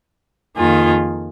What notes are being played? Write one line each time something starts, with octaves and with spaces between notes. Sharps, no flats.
F2 D#3 A#3 F4 G#4